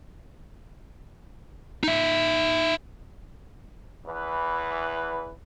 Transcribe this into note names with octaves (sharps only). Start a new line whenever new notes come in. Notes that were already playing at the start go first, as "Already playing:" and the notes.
D#4 E5
E2 E3 B4